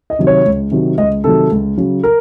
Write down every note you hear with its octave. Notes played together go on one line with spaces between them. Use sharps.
D#5
C3 D#3 F#3
C#5
C#2
C3 D#3 F#3
C#2 D#5
C3 D#3 F#3 A4
C#2
C#3 F#3
A#4